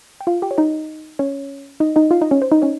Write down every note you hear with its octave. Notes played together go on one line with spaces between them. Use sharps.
G5
F4 F5
G4 G5
C#5
D#4 D#5
C#4 C#5
D#4 D#5
D#4 D#5
F4 F5
D#4 D#5
C#4 C#5
C5
D#4 D#5
C#4 C#5